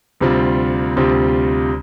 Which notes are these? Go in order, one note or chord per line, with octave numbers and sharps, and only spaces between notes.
D2 C3 G3 C4 F4
D2 C3 G3 C4 F4